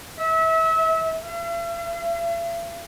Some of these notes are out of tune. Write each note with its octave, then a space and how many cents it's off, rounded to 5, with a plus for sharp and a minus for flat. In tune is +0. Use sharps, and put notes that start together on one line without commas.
E5 -30
E5 +45